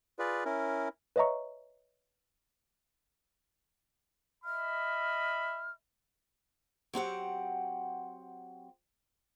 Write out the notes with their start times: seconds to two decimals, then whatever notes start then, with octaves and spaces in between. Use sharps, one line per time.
0.19 F4 G#4 B4 D5
0.45 C#4 E4 A#4
1.16 B4 C#5 D#5 E5 A#5 C#6
4.45 D#5 E5 B5 F6
6.94 F#3 C4 G4 F#5